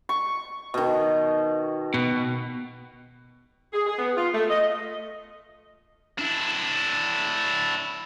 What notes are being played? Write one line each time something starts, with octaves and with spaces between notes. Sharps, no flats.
C#6
B2 D#3
B2
G#4
G#4
B3
F4
A3
D#5
D4 E4